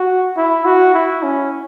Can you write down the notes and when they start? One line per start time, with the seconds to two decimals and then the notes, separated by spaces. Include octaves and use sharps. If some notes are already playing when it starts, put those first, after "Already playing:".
Already playing: F#4
0.37 E4
0.65 F#4
0.94 E4
1.23 C#4